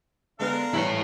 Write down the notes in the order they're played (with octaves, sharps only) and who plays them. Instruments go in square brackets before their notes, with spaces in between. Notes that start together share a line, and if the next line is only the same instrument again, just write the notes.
[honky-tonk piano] D3 G#3 B3 [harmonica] D4 A#4 F5
[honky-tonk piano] G2 E3 [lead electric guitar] E4 C#5